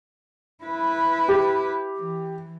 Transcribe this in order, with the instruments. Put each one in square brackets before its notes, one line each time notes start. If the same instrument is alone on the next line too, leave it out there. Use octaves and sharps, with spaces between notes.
[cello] E4 B4
[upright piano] G4
[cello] E3